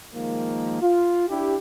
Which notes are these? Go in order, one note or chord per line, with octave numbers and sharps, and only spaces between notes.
D#3 F3 G#3 A#3
F4
D4 E4 G4